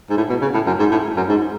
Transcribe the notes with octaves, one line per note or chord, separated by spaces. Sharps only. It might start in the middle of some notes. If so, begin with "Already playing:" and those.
G#2
A2
B2
C#3
A2
F#2
G#2
A2
F#2
G#2